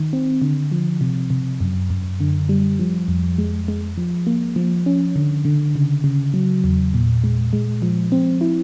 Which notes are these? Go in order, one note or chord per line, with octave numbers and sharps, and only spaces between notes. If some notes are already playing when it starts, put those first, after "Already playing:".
Already playing: D#3
C4
D3
F3
C3
C3
F#2
F#2
D3
G3
F3
F2
G#3
G#3
F3
A#3
F3
C#4
D3
D3
C#3
C#3
F#3
E2
A#2
G#3
G#3
F3
C4
E4